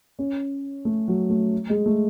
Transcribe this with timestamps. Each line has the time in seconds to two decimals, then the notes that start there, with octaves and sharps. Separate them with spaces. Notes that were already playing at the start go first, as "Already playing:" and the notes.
0.19 C#4
0.85 A3
1.08 F#3
1.30 A3
1.70 G#3
1.86 A3